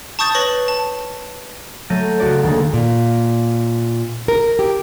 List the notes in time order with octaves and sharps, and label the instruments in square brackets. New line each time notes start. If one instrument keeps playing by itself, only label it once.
[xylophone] A5 C#6 D#6 G6 A6
B4 C#5 C#6 A#6 F#7
A5
[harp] F#3 A3 G6 A#6 D#7
C#2 F#4 D5
D2 D#3 G#3 A#3
[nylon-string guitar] A#2
A#4
G4